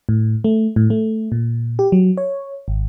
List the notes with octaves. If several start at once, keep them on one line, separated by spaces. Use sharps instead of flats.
A2
A3
A2
A3
A#2
G4
F#3
C#5
G#1